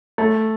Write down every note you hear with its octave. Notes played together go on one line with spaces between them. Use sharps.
A3